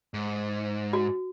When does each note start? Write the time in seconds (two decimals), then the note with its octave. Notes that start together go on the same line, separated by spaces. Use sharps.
0.14 G#2
0.93 F#4